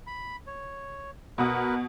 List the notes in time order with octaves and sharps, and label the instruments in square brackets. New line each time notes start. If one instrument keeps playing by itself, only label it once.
[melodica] B5
C#5
[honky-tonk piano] B2 F#5 D#6 [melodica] A#4 B4